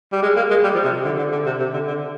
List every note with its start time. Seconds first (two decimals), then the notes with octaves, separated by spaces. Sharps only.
0.13 G3
0.23 G#3
0.36 A#3
0.50 G#3
0.64 G3
0.74 F3
0.84 C3
1.05 D3
1.19 D3
1.32 D3
1.46 C3
1.60 C3
1.74 D3
1.87 D3